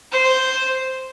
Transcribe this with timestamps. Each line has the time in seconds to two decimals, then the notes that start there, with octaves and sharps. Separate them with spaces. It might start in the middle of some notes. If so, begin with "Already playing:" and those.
0.12 C5